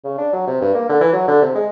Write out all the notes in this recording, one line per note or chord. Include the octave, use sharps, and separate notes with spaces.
C#3
D4
F#3
C3
G2
A#3
D3
E3
F#3
D3
C3
G#3